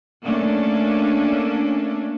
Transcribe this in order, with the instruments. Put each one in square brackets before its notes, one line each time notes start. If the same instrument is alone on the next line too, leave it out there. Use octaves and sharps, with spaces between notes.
[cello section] A3 A#3 C#4 D4